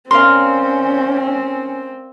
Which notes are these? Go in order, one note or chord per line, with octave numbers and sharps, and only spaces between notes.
C4 C#4 A#4 D5 F5 C6